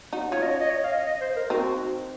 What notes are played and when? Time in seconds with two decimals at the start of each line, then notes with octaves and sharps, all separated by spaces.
0.13 D#4 F#4
0.32 C#4 F4 C#5
0.42 D#5
0.51 C#5
0.60 D#5
0.70 C#5
0.84 F5
0.91 D#5
1.07 D#5
1.21 C5
1.36 A#4
1.50 C4 D#4 F#4